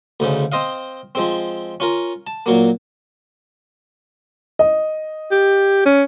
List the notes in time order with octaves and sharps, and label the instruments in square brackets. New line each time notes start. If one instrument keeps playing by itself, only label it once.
[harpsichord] D2 G#2 C#3
C4 C5 D#5 F5
F3 G#3 C4
C#4 F4 A#4
A5
A#2 F#3 A#3
[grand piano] D#5
[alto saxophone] G4
C#4